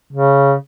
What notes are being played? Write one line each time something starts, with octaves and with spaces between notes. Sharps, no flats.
C#3